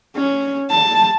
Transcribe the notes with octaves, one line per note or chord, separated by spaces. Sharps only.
C#4
A5